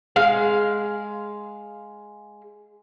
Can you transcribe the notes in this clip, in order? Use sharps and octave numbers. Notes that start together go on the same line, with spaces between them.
G#3 F5